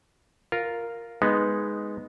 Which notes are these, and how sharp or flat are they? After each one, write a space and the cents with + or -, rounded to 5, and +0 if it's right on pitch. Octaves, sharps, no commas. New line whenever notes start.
F4 +0 A#4 +0
G#3 +0 B3 +0 D#4 +0